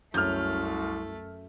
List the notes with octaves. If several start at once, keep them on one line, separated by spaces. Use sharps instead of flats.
C2 F#2 A3 F6 G6